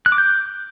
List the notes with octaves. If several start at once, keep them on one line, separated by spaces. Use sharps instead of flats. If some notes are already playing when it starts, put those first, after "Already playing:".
F#6
D6
G6